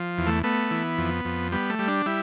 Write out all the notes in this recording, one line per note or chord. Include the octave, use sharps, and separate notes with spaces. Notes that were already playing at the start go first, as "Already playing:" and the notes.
Already playing: F3
E2
A3
A3 B3
E3
F2
F2
G3 B3
A3
G3
D4
G3 E4